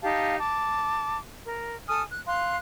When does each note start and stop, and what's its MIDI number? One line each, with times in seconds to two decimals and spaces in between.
0.02 0.36 63
0.02 0.36 67
0.02 0.36 77
0.02 0.36 81
0.39 1.17 81
0.39 1.17 86
1.45 1.76 70
1.89 2.03 69
1.89 2.03 80
1.89 2.03 87
1.89 2.03 89
2.11 2.22 90
2.26 2.56 77
2.26 2.56 84
2.26 2.56 90